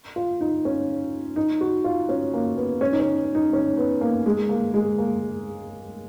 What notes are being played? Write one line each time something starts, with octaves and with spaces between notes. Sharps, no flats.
F4
D#4
C#4
D#4
F#4
F4
C#4
A#3
B3
C#4
D#4
C#4
D#4
C#4
B3
A#3
G#3
A#3
G#3
A#3